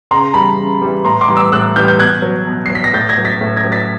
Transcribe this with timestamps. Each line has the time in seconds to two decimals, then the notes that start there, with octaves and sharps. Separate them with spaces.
0.11 C#3 A#5 C6
0.34 E3 G3 A5 B5
0.57 C#3
0.82 E3 G3
1.05 A2 A#5 C6
1.21 C6 D6
1.28 E3 G3
1.36 D6 E6
1.52 A2 E6 F#6
1.76 E3 G3 F6 G6
1.88 G6
1.99 B2 F#6 G#6
2.22 F#3
2.47 B2
2.66 F#3 C7
2.75 B6
2.84 A#6
2.94 A2 G6 A6
3.09 G#6 A#6
3.18 F#3
3.25 A6 B6
3.41 A2
3.57 G#6 A#6
3.64 F#3
3.72 A6 B6